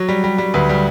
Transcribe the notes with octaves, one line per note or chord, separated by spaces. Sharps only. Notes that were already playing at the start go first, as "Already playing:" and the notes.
Already playing: F#3 C#5
G3
G3
G3
D2 B4
G3